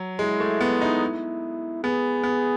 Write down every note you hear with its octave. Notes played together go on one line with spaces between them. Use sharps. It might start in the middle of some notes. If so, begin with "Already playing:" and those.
Already playing: F#3
G#3 E4
A3
B3
D#4
B3 G#4
B3